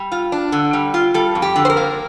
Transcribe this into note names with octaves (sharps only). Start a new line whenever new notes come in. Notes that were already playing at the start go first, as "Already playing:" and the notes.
Already playing: G3
F4
D4
D3
G3
F4
G3 A4
F2
G4
D3
C5
A#4
A#3